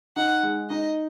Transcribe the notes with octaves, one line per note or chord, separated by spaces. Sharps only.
D#4 F#5
G#3
D#4 D#5